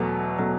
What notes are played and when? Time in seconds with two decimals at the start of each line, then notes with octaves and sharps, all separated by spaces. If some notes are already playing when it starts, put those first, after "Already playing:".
Already playing: E2 B2 F#3 A3
0.38 B2 F#3 A3